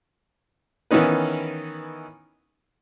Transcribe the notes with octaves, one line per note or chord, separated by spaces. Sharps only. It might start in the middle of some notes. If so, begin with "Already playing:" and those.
D#3 E3 B3 C#4 D#4 B4